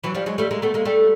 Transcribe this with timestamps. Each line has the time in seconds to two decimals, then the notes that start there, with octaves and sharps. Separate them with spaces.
0.04 E3 F#3
0.15 F3 G3
0.26 F#3 G#3
0.38 G3 A3
0.51 G#3 A#3
0.62 A3 B3
0.74 G#3 A#3
0.85 G3 A3